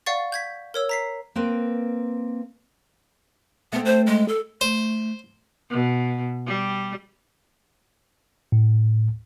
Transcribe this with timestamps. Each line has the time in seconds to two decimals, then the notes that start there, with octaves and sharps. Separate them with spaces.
0.06 D5 F5 F#5 C#6 A6
0.32 G6 G#6 B6
0.74 A#4 C#5 E6
0.89 A#5 B6 C7
1.36 A#3 C4 B4 C5
3.73 A3 B3 C4
3.85 C5
4.06 G#3
4.28 A4
4.61 A3 C5
5.70 B2
6.46 G3
8.52 A2